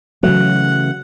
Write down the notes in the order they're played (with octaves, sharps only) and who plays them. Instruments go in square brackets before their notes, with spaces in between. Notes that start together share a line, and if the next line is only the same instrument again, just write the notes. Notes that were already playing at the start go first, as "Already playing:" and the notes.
[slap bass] C#3 E3 A3 [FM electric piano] F#3 [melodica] F#5